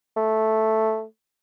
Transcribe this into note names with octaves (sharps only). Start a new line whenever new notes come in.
A3